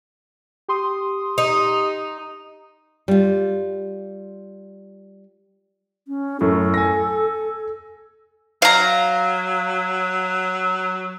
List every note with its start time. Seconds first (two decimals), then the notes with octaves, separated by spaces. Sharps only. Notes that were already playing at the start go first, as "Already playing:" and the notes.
0.68 G4 C6 D#6
1.38 D#4
3.08 G3 F4
6.08 C#4
6.41 F#2 A2 A4
6.74 G#5 A#6
8.62 F#3 F5 A#5